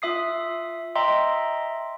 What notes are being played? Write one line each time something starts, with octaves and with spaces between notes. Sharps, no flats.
F4 E5 D#6 C7
D#5 E5 G5 A#5 C6